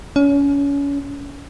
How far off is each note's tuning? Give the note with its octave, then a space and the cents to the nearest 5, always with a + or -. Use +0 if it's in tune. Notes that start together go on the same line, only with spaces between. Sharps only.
C#4 +30